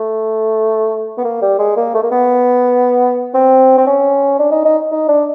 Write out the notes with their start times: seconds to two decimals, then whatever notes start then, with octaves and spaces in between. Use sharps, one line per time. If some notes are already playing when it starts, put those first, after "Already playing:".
Already playing: A3
1.18 B3
1.24 A#3
1.42 G3
1.59 G#3
1.77 A#3
1.95 A3
2.03 A#3
2.12 B3
3.34 C4
3.78 C4
3.87 C#4
4.40 D4
4.52 D#4
4.65 D#4
4.92 D#4
5.09 D4